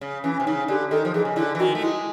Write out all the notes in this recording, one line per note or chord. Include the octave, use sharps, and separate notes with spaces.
C#3
E3 C#4
C3
C#3 D#4
D3 G4
D#3 A4
F3
E3 G#4
C#3
D3 E4
E3
D#3 F#4
A3
G#3 E4